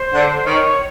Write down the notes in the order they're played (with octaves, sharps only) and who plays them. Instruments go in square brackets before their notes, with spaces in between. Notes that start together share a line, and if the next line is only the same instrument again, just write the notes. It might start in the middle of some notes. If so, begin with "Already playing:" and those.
Already playing: [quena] C5
[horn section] D3
[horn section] D#3 [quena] C#5